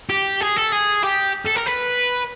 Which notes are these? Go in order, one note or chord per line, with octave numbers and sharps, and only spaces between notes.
G4
G#4
A4
G#4
G4
A4
A#4
B4